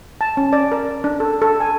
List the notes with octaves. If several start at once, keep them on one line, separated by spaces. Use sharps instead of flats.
A5
C#4
D5
A#4
D4
A4
A4
G#5